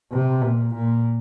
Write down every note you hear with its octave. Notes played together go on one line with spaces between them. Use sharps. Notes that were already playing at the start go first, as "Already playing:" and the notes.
C3
A#2
A#2